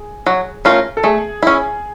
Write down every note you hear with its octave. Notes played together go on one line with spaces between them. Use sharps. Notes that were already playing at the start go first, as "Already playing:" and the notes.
Already playing: G#4
F#3
A3 C#4 F4 A#4
A4
A3 G#4
C#4 E4